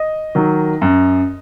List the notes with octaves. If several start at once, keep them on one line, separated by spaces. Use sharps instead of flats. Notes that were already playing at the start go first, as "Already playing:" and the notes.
Already playing: D#5
D#3 F#3
F#2